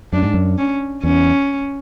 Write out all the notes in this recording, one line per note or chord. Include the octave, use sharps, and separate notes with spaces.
F#2 D4
G#2
F#2
C#4
E2 C#4